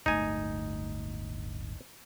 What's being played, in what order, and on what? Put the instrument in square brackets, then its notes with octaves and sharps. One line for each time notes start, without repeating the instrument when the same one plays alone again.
[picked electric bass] D1 G1 A3 [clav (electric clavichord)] D#4 G#5